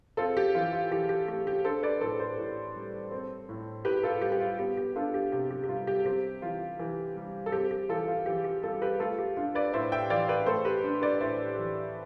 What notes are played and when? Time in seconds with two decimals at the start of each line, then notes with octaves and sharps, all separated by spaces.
0.17 C4 F4 A4
0.37 G4
0.55 E3 F4
0.73 F4
0.91 E3 G4
1.09 G4
1.28 A3 G4
1.47 G4
1.65 D4 A4 C5
1.83 B4 D5
2.01 A2 A4 C5
2.20 A4 C5
2.38 A2
2.75 G3
3.11 C4
3.49 A2
3.85 A2 G4 B4
4.03 F4 A4
4.21 G3 G4
4.32 G4
4.40 F4
4.59 B3 G4
4.77 G4
4.96 D4 F4 A4
5.14 G4
5.32 C3 G4
5.51 G4
5.64 G4
5.69 G3 F4
5.87 G4
6.06 C4 G4
6.42 E3 F4
6.79 E3
7.16 G3
7.46 A4
7.52 C4 G4
7.71 G4
7.89 E3 F4 A4
8.08 F4
8.26 E3 G4
8.44 G4
8.63 G3 F4 A4
8.82 G4 B4
9.00 A3 F4 A4
9.18 G4
9.37 D4 F4
9.55 B4 D5
9.73 A2 C5 E5
9.92 E5 G5
10.10 E3 D5 F5
10.29 B4 D5
10.46 A3 A4 C5
10.65 G4 B4
10.84 D4
11.02 B4 D5
11.21 A2 C5 E5
11.58 E3